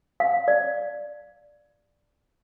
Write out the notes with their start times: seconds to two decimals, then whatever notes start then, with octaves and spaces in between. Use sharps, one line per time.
0.20 F5
0.48 D5